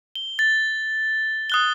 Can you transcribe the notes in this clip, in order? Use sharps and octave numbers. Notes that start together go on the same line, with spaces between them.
G7
A6
D#6 F#6 G7